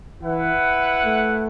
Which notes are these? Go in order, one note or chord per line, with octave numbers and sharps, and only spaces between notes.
E3 E4 B4 F#5
A3